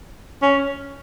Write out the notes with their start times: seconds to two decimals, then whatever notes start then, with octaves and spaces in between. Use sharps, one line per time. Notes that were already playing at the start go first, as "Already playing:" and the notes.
0.42 C#4